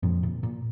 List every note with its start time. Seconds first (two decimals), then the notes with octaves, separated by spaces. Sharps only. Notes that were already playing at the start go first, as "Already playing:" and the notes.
0.03 F2 A#2 F3
0.23 A#2
0.43 A#2